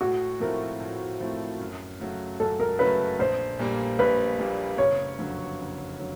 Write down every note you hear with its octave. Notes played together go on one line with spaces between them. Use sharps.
A2 F#4
F3 A3 C4 E4 A#4
A2
F3 A3 C4 E4
F#2
C#3 F#3 A3
F#2 A4
A#4
C#3 F#3 A3 B4
A#1 C5
A#2 G3 A#3
A#1 B4
A#2 G3 A#3
F#1 C#5
F2 D3 F#3
F#1
D3 F#3